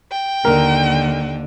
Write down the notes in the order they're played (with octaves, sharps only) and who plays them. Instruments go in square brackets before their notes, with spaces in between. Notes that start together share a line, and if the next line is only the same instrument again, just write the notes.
[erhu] G5
[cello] D#2 D3 [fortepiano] A#4